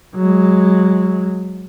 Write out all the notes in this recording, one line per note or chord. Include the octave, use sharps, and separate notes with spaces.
F#3 G#3